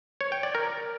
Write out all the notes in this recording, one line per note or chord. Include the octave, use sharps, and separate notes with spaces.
C#5
G5
D5
A#4